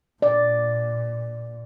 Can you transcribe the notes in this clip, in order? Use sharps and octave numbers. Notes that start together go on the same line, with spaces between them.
A#2 D5